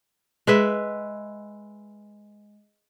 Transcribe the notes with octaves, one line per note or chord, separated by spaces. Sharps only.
G#3 B4 E5